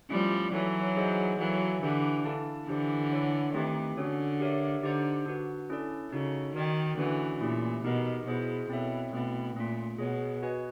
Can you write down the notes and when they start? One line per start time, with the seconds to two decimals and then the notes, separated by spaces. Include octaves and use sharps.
0.10 F3 G3 A3 C#4 E4
0.53 E3 F#3 D#4 F#4 A4 C#5
0.96 D#4 G#4 C5 D#5 F#5
1.39 E3 F#3 F#4 A4 D5 F5
1.82 D3 E3 D4 G4 B4
2.25 E4 A4 D5 F5 A5
2.68 D3 E3 D4 G4 C5
3.11 E4 A4 C#5 F#5
3.54 D#3 A3 C4 D#4 G4 B4
3.97 D3 C#4 F#4 A4 C#5
4.40 G4 A#4 C#5 E5
4.83 D3 D#4 G4 C5
5.26 D4 F#4 B4
5.70 C#4 E4 A4 D5
6.12 C#3 D#4 F#4 A4
6.55 D#3 F#4 A#4 D5 G5
6.97 D3 E3 A#3 C#4 F#4 B4
7.41 A#2 A3 C#4 E4 G4
7.84 B2 D#4 G4 A#4 D#5
8.27 B2 E4 G#4 C5
8.69 B2 C4 E4 A4 C#5 E5
9.13 B2 A3 C4 E4
9.56 A#2 A3 C#4 F4
9.99 B2 G#4 C#5 F#5
10.42 F#4 B4 D#5 G#5